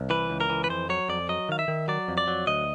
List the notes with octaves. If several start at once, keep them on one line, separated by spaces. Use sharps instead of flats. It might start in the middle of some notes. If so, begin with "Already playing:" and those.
Already playing: C2
E3 B4
C#2
A#4
E3
B4
F2 C5
F#3 C#5
F2 D5
F#3 D#5
D#3 F5
E5
D#3
F#3 D5
F2
D5
F#3
D2 D#5